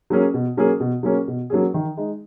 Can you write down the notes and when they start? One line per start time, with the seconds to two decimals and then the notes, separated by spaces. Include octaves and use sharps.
0.10 F#3 A#3 C#4 G#4
0.34 B2
0.57 F#3 A#3 C#4 G#4
0.80 B2
1.03 F#3 A#3 C#4 G#4
1.28 B2
1.50 F#3 A#3 C#4 G#4
1.74 D#3
1.97 G#3 D#4